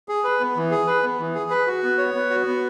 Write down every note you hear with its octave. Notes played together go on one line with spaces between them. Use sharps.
G#4
B4
B3
E3
G#4
B4
B3
E3
G#4
B4
F#4
B3
C#5
B3
F#4
B3